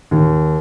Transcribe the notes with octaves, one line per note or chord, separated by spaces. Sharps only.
D#2